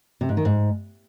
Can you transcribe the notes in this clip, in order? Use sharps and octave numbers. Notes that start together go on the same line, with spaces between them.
C3
G#2
D#3
G#2